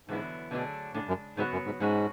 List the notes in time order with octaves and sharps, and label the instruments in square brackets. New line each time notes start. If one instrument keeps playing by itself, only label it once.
[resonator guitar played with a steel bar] E2 D3 F#3 B3 E4 [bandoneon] G#2
[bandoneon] B2 [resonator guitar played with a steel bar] D3 F#3 A3 D4 G#4
[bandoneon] A2 [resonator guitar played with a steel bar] C#3 G#3 D4
[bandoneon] F#2
[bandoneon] G#2 [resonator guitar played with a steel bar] C#3 F#3 B3 F#4
[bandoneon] F#2
G#2
[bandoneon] G#2 [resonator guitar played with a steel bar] B2 G#3 C#4 F#4